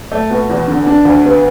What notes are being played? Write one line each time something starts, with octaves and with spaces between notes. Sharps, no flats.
A3
B2
E2
D3
D4
D2
B3